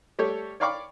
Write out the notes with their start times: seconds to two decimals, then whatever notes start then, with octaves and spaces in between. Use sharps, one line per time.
0.19 G3 A3 G4 A4 C#5 D5
0.60 C#5 D5 F5 B5 C#6 D6